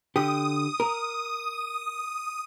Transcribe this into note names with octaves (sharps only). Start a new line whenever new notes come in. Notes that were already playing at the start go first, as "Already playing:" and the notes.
D3 G4 D#6
A#4